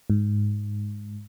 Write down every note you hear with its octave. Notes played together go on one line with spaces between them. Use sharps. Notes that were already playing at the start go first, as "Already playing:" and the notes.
G#2